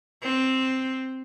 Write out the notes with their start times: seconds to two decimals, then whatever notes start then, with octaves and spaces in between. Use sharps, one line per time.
0.22 C4